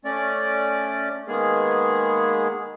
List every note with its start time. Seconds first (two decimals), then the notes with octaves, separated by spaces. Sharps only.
0.05 A3 C#4 D5
1.28 D#3 G#3 A#3 B3 G#4